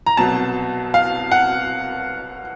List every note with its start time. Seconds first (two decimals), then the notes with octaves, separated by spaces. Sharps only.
0.06 A#5
0.17 C2 B2 F#3 A5
0.94 F5
1.32 F#5